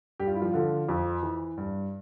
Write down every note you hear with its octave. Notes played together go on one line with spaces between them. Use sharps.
G2 G4
F4
E4
F3 F4
D3 F3
F2
E3
G2